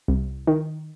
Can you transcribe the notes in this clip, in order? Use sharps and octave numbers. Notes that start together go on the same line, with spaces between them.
C2
D#3